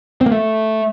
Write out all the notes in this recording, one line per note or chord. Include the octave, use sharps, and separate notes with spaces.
C4
A#3
A3